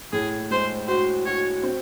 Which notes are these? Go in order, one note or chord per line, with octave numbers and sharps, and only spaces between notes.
A2 G#4
G#3 C5
F#4 C5
F#4 C#5
C4